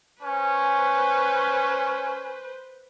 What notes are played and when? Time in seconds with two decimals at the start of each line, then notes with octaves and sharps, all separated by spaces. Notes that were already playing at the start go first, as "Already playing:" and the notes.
0.22 C#4 B4 C5